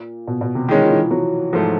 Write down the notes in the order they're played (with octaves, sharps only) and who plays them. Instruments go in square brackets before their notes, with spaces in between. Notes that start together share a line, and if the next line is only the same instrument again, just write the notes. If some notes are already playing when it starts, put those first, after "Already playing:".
Already playing: [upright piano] A#2
B2
B2
C3
[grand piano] D#3 G#3 C#4 [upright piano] E3
[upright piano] F3
E3
F#3
[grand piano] G#2 F3 A3